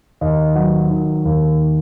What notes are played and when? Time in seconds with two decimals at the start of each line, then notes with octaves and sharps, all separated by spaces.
0.21 D#2 D#5
0.56 F#3
0.90 D#3
1.25 D#2